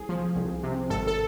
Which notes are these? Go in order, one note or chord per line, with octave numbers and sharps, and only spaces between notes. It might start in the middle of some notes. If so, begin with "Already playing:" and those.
Already playing: C2 G#4
F3
C2
C3
G#1 A4
A4